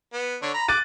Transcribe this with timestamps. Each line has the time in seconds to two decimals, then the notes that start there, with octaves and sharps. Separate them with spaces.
0.13 B3
0.42 D3 D4 C#5
0.54 A#5 B5
0.68 D6 F#6 A6 D#7